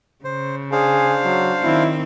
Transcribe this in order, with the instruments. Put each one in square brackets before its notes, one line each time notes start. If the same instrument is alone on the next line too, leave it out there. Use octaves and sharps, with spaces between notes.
[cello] C#3 [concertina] C5
[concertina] D4 C5 F5 [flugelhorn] G#4
[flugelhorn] F#3
[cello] D#3 C4 [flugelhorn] E4